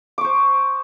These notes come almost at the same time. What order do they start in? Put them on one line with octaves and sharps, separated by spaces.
D6 C#6 C5